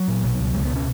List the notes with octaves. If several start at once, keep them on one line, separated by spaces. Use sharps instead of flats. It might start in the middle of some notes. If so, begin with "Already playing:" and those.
Already playing: F#3
A#2
B2
C#2
C#2 G#3
B3
B2
C#4